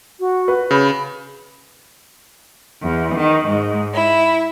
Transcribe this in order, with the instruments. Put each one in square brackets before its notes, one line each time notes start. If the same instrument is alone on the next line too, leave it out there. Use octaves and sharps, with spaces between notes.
[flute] F#4
[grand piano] B4
[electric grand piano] C#3 [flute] B5
[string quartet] E2
D#3
G#2
E4